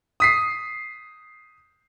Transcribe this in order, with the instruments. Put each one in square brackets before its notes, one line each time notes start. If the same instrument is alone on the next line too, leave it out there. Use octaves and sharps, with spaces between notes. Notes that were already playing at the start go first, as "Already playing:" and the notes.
[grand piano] D#6 B6 C7